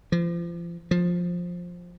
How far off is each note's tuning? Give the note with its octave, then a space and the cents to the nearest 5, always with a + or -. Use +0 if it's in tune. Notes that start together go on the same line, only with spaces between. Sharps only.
F3 -35
F3 +10